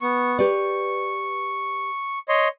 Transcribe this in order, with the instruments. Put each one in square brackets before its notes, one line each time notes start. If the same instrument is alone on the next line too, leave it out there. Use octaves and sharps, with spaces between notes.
[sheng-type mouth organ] B3 C#6
[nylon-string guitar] G4 B4 D5 [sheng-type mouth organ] C#6
[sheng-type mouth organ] C#5 D#5 C6